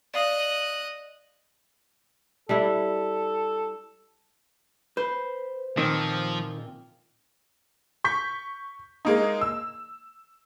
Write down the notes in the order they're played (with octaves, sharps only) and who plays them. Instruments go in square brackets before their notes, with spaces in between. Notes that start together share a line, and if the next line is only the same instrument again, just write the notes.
[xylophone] D5 F5 D#6 [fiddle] D#5 F#6
[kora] G3 D4 E4 [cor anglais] A4
[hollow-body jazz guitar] B4 [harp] C5
[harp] A#2 C4 [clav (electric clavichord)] D#3 [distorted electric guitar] F3
[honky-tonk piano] C#6 G6 B6
G#3 A#3 D#4
E6